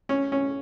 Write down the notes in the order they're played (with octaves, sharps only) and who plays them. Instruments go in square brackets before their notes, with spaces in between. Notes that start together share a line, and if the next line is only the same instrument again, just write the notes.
[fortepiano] C#4
C#4